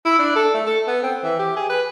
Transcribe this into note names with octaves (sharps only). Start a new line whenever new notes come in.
E4
D4
A4
A3
A4
B3
C4
E3
G4
G#4
B4